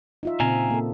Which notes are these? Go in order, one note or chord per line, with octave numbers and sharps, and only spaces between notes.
D#4 F4 E5
A#2 C#3 C4 F5 G#5 A#5
A#3 A4